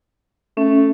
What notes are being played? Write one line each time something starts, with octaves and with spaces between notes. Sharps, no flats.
A3 C#4